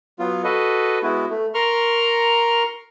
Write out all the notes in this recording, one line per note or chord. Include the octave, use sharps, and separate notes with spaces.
F#3 B3 F4
F#4 A4 B4 D#5
G#3 B3 E4 F#4
A3
A#4 A#5 C6 C#6 F6